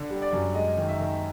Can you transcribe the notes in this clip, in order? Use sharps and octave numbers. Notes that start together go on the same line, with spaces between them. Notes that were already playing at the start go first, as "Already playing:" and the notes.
Already playing: D3
G3
D5
F#2
G#3 D#5
D#3
E5
D#3